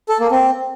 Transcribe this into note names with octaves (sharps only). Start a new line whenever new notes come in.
A4
A#3
C4